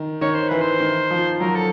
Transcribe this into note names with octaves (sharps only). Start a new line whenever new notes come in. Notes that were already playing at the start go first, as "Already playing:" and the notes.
Already playing: D#3
D#3 C#5
C5
E3 B4
C5
D#3
F3
F#3 A#4
A4